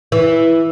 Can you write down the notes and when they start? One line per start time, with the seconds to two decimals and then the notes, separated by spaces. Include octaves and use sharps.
0.12 E3